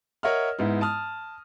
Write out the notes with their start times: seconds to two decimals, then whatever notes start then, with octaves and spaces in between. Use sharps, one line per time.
0.23 A#4 C#5 D#5 E5 F#5 F6
0.59 G#2 B3 E4
0.81 A5 D#6 F6